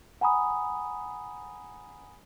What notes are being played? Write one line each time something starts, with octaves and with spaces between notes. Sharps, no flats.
F#5 G#5 A#5 B5 D#6